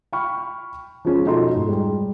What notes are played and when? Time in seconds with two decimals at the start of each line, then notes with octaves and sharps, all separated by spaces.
0.13 G5 B5 C#6 F6
1.05 F3 G#3 C#4 F4
1.26 B2 F3 D#4 F#4 A4 C6
1.55 G#2
1.68 G3 G#3